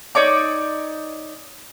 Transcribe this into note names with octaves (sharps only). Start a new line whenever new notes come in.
D#4 C#5 D5 D6